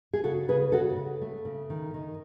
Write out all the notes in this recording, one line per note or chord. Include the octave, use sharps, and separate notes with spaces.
G#4
C#3 F#4 A4
C#3 G#4 B4
C#3 F#4 A4
C#3
A3
C#3
D#3
D#3